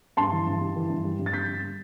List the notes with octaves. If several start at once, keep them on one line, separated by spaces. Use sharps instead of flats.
G2 A5 C6
E3
G2
G3
E3
G2
G3
G2
A6
G3 G6 B6
G3
G3